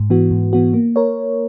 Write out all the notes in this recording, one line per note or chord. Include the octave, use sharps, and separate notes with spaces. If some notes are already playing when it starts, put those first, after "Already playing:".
Already playing: G#2
E3 B3 F#4
G#2
E3 B3 F#4
A#3
A#4 C#5